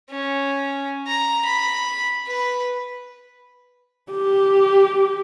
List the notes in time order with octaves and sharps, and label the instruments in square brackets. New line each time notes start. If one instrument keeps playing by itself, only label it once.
[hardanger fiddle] C#4
A#5
B5
B4
[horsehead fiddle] G4